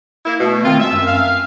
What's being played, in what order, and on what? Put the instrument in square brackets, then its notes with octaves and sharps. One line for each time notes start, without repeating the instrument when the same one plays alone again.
[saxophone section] A#3 E4
[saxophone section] B2 [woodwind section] A3
[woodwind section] D#3 C4 [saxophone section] F4
[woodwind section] G#3 [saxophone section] E5
[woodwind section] F#2
[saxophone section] F5